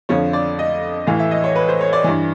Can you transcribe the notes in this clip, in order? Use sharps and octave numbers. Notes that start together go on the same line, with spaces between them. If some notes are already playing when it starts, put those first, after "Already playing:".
F2 D3 F3 C#5
D5
D#5
A2 E3 F5
E5
D#5
C#5
B4
C5
C#5
D5
G2 E3